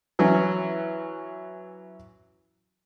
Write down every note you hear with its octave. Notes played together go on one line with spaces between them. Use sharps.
E3 F#3 C#4